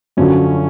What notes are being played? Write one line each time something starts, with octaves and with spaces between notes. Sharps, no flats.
F#2 D3 F3 C#4